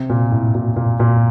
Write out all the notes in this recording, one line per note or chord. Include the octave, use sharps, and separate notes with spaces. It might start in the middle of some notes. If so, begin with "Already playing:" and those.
Already playing: C3
A#2
A2
A#2
A#2
A#2